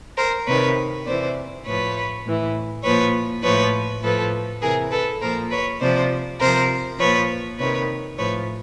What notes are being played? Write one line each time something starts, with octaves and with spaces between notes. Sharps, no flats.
A#4 C5
C3 D#3 B4 C#5
C3 E3 C5 D5
A2 F3 B4 C#5
A2 E3
A#2 F3 B4 C#5
A2 F3 B4 C#5
A2 F3 A4 B4
C3 E3 G#4 A#4
A4 B4
A#2 F3 A#4 C5
B4 C#5
C3 F3 C5 D5
C3 F3 A#4 C5
A#2 F3 B4 C#5
C3 D#3 B4 C#5
A2 F3 B4 C#5